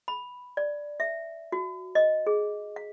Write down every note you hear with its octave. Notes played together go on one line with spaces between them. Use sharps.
B5
D5
E5
F#4
D#5
G#4
F5